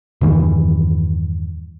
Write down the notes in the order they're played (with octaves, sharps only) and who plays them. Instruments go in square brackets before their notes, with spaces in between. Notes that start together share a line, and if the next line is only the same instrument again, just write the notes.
[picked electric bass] E2 G2 D#3 E3